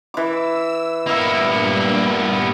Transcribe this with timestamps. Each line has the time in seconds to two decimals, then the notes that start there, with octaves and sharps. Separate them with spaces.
0.14 E3 D6 E6
1.07 G2 A#2 A#3 B3 E4 E5